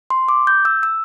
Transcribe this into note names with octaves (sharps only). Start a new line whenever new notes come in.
C6
D6
G6
E6
E6